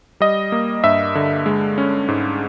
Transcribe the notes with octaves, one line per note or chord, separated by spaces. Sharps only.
G3 D#5
A#3
G2 E5
D3
G#3
C#4
G#2